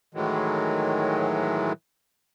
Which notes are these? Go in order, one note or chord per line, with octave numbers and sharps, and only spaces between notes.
A2 D#3 E3 F#3 G#3